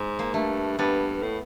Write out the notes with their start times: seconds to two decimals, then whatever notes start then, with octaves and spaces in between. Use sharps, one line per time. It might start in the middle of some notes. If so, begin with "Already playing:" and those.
Already playing: G#2
0.19 A#3
0.34 G2 A3
0.78 G2 B3
1.22 A2